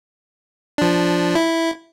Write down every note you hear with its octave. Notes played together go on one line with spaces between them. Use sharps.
F3 D4
E4